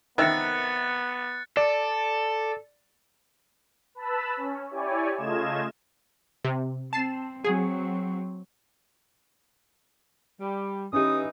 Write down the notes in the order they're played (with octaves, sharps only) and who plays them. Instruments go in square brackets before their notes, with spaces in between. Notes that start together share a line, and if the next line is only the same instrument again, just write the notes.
[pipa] C3 A#4 E5 [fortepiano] D#3 [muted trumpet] B3 [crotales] F#6 A6 C#7
[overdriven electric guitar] A4 [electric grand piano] D5
[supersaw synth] B4 A5 B5 E6
C#4
E4 G4 C#5 D5 G#5
C#3 A3 F4 D#5 G#6 E7
[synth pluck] C3
[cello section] C4 [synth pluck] A5 C7 E7
[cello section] F#3 C4 [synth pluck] G#4
[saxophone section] G3
[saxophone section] E3 D#4 [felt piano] C#4 G4 [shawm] D#6